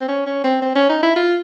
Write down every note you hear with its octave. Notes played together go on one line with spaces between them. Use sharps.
C4
C#4
C#4
C4
C4
C#4
D#4
E4
F4